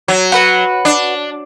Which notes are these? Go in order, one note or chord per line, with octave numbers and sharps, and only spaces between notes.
F#3
F#4 B4 F#5
D4